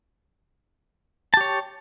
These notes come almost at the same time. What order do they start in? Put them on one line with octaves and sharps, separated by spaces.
A5 G4 C#5